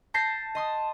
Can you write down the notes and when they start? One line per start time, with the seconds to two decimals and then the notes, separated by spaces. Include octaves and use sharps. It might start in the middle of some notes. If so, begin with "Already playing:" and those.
0.14 A5 G6 A#6 C7
0.55 D#5 C6 D#6